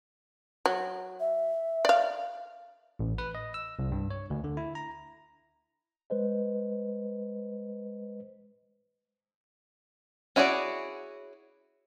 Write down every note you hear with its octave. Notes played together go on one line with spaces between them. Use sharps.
F#3
E5
D5 F5
A1
B4
D#5
E6
C2
G2
C#5
D2
D3
E4
A#5
G#3 B4 C5 D#5
C#4 E4 F#4 G#4 D5